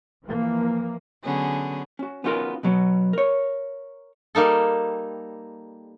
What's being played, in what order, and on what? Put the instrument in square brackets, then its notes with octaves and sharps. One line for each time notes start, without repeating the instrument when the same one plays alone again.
[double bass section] E3 F3 A#3
[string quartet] D3 F#3 B3 C#4 G#4
[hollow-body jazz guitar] C#4 F#4
B3 C#4 D#4 F4 F#4 A#4
B2 F#3 B3
A#4 C#5
[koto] G3 A#3 D#4 A4